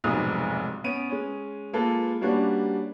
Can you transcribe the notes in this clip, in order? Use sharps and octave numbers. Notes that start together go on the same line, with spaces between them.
F1 B1 G#2 D#6
B3 C#4 D7 D#7
G#3 C#4
G#3 A#3 F4 A4 B4
G3 A#3 C#4 D4 F#4 B4